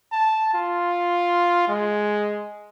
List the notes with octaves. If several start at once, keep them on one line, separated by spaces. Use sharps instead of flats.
A5
F4
G#3